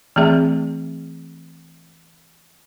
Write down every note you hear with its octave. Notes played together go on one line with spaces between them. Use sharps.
E3 A3 C4 G#4 E5